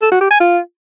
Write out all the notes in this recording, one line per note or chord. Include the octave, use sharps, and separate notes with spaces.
A4
F#4
G4
G#5
F4